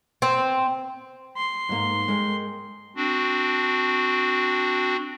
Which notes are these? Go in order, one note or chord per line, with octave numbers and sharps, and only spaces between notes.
C4
C6
G#2 A#3
G#3 A#4 G5
C4 D4 F#4